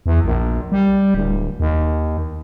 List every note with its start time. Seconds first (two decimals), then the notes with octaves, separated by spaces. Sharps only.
0.06 E2
0.24 A#1
0.72 G3
1.14 D1
1.60 D#2